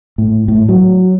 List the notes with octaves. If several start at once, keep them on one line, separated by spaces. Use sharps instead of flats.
A2
A2
F#3